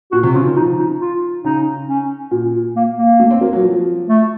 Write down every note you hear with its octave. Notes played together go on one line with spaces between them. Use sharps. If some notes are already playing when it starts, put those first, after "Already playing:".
A#2 F#4
C3
C#3 F4
D#3
F3 D#4
D#4
F4
C#3 D#4
C#4
A#2
A#3
A#3
A3
C4
A#3
F#3
F3
A3